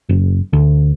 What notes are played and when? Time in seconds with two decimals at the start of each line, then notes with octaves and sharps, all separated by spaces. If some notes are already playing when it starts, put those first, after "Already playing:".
0.09 F#1
0.53 D2